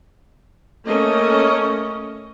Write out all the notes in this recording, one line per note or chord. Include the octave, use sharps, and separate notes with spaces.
A3 A#3 C#4 D#5